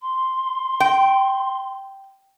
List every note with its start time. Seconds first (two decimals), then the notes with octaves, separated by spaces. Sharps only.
0.02 C6
0.80 G5